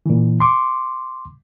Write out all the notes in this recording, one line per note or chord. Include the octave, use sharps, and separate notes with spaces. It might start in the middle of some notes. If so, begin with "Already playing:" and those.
A#2 E3
C6 D6